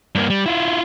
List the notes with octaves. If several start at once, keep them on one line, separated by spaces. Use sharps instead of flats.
G2 A#3
G3
E4 F4